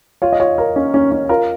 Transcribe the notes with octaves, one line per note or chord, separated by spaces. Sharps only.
F4 C#5
D#5
F4 C#5
F4 A#4
C#4
C#4
C#4
F4 A#4